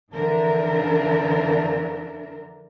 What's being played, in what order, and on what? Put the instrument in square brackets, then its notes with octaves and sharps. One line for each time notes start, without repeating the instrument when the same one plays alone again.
[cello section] F2 D3 E3 D4 A#4 E5